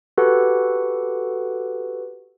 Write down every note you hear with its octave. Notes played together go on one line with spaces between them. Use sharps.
F#4 G4 A4 B4 F#5